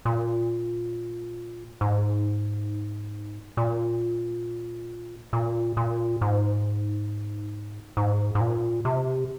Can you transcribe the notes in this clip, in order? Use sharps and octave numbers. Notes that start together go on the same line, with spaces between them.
A#2
G#2
A#2
A#2
A#2
G#2
G#2
G#2
A#2
C3